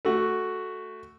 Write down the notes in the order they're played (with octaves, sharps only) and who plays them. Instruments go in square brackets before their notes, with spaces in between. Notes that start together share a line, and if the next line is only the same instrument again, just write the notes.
[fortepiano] A3 F#4